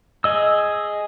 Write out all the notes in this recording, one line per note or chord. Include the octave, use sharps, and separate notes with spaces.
G#4 D#5 E6